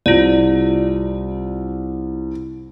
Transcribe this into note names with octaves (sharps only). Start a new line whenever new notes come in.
C2 F4 D5